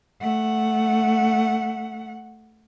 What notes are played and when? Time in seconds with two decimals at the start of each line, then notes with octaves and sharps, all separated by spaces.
0.21 A3 F#5